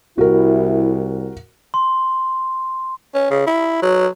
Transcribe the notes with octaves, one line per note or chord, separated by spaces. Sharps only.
C2 E4 F#4 A#4
C6
C#4
C#3
E4
F#3